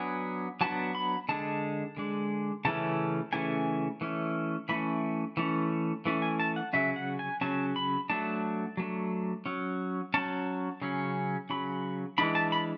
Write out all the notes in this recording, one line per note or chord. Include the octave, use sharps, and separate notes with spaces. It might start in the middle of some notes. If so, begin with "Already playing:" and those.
Already playing: F#3 B3 D4 G#5
F#3 B3 D4 A5
B5
D3 G#3 D4 A5
D3 G#3 D4
C#3 E3 A3 C#4 A5
C#3 E3 A3 C#4 G#5
E3 A3 C#4
E3 A3 C#4 B5
E3 A3 C#4
E3 A3 C#4
G#5
A5
F#5
C#3 F#3 C#4 E5
F#5
G#5
C#3 F#3 C#4 A5
B5
F#3 A3 D4 A5
F#3 A3 D4
F#3 C#4
F#3 C#4 A5
C#3 F#3 C#4
C#3 F#3 C#4 B5
E3 G#3 D4 B5
A5
B5